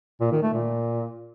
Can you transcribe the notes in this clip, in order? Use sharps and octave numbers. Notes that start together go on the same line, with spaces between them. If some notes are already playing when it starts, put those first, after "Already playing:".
A#2
D#3
A3
A#2